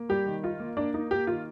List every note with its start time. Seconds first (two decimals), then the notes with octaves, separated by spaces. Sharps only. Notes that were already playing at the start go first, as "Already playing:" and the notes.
Already playing: A#3
0.09 G3 G4
0.26 D#3
0.43 D#4 F4
0.60 A#3
0.77 A#3 D4
0.94 A#3 D#4
1.11 A#3 G4
1.27 D#3 F4